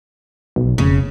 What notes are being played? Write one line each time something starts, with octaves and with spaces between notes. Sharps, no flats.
B1
F1 C#3